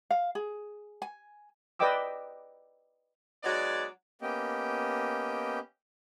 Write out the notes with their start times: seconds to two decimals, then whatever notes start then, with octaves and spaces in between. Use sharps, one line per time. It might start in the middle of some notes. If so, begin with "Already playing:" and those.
0.10 F5
0.35 G#4
1.02 G#5
1.79 B4 D5 D#5 G5 D6 E6
3.44 F#3 G#3 B3 D#4 D5
4.22 A#3 B3 C#4 G4 D#5 G5